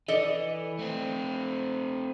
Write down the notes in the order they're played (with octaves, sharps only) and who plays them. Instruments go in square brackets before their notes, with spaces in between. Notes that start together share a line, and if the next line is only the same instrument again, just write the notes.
[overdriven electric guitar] E3 [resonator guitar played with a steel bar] A4 D5 D#5
[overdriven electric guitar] A3 C4